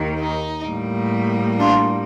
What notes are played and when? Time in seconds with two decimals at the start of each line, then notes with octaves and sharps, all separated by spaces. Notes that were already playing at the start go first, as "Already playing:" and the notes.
Already playing: D#2 D#3 A#3
0.20 D#4
0.65 A2 G3 A#3
1.58 D4 F4